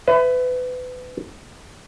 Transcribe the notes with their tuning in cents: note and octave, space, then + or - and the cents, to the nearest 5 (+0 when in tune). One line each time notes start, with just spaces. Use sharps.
B4 +30 E5 +0